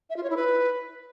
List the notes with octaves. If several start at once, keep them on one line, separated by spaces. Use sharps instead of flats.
E5
F4
C#5
E4
B4